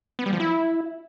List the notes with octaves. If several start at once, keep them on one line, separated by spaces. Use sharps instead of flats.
B3
G3
F3
E4